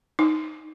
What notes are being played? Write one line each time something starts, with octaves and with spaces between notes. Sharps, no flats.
D#4